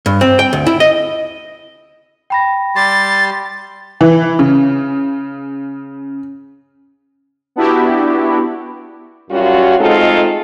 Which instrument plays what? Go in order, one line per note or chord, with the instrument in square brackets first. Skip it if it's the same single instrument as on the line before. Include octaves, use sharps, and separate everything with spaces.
[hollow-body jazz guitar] G2
C4
G5
D2
E4
D#5
[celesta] G5 B5 A#6
[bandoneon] G3 G4 C6 [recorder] A6
[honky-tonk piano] E3
C#3
[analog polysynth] B3 D4 E4 F#4 G4
[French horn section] F#2 G3 C#4 F4 F#4
G#3 A3 C4 D#4 F4 A4